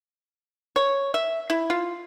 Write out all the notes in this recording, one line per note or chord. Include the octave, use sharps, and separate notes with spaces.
C#5
E5
E4
F4